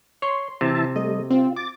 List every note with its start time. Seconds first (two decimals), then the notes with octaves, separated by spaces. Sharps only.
0.22 C#5 C6
0.61 C3 E3 E5 A5
0.96 G3 A3 D#5
1.30 C4 F4
1.56 D6 A6